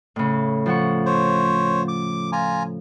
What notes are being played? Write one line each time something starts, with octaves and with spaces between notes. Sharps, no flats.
A2 C#3
F3 F#5 C#6
C5 C#5
D6
F4 G#5 A#5